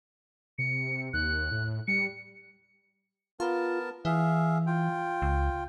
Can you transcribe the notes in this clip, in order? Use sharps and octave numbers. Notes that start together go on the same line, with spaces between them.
C3 C#7
D#2 F#6
A2
G3 C#7
B3 F4 A#4 A5
E3 G#4 E5 F5
F4 G5
C#2